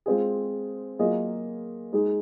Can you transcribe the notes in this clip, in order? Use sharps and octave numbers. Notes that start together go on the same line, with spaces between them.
G#3 C4 F4 G#4
F#3 A#3 F4 G#4 D#5
G#3 D#4 G#4